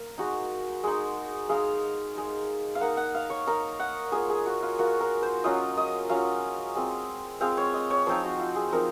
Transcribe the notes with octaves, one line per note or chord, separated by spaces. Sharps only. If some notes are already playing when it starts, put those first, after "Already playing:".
Already playing: A#3
G#3 D#4 F#4
G#3 D#4
G#3 D#4 F5
G#3 D#4
F5
A#3 D#4 F#5
F#5
F5
C#5
A#3 D#4 A#4
F#5
A#3 F4 G#4
G#4
F#4
F4
A#3 F4 F#4
A#4
C5
F#3 C#4 F4 D#5
D#5
F#3 C#4 F4 F5
G#3 C4 F4
G#3 C4 F4 F5
C#5
D#5
C#5
F3 C4 D#4 C5
F#4
F4
G#4
F3 C4 D#4 A#4